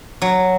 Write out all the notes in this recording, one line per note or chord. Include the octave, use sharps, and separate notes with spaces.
F#3